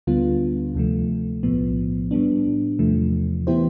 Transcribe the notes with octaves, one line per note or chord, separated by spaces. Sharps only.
D2 D3 G3 B3 F4
D2 C3 F3 A3
B1 A2 F3 B3
A2 G3 B3 D4
E2 C3 F3 A3
E3 B3 E4 G4 C5